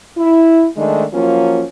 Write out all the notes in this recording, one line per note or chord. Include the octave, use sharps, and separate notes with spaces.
E4
D#3 G#3 A3 D4 D#4
F3 F#3 A#3 C#4 F4